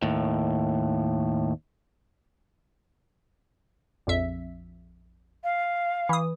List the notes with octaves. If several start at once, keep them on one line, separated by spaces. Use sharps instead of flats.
D#2 A2
A#1 F2 E5
F5
E3 D#6